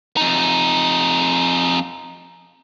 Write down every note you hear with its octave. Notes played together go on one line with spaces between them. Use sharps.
F2 D#4